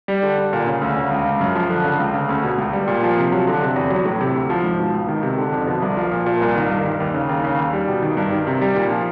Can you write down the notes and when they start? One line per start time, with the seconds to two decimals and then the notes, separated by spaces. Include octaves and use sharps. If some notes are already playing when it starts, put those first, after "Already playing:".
0.08 G3
0.23 D3
0.38 G3
0.53 A#2
0.67 C#3
0.82 D2
0.97 C#3
1.11 C#2
1.25 C#3
1.40 F#2
1.55 F3
1.70 D3
1.84 C#3
2.00 C#2
2.14 C#3
2.29 D2
2.43 B2
2.58 C#2
2.73 G3
2.88 A#2
3.03 F3
3.17 C3
3.32 F#3
3.47 D3
3.61 C3
3.76 E2
3.90 F#3
4.05 A2
4.21 C3
4.35 D2
4.50 F3
4.64 G#2
4.79 B2
4.94 C#2
5.08 D#3
5.23 C3
5.38 D3
5.52 F2
5.67 B2
5.82 C2
5.97 F3
6.12 A#2
6.26 A#2
6.41 C2
6.56 D#3
6.70 G2
6.85 D#3
7.00 D#2
7.14 C#3
7.29 D#2
7.44 C#3
7.58 D#2
7.73 G3
7.88 B2
8.02 D#3
8.17 G2
8.33 D#3
8.47 C3
8.61 G3
8.76 A#2
8.91 F3